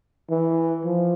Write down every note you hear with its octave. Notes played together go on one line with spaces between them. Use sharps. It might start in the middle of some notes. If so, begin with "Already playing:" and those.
E3
F3